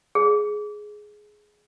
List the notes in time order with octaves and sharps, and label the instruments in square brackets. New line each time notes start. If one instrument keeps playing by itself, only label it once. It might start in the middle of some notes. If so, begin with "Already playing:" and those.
[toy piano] G#4